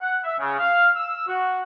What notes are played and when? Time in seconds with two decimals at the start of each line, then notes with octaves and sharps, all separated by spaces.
0.01 F#5
0.24 E5
0.40 C#3
0.59 F5
0.96 E6
1.28 F#4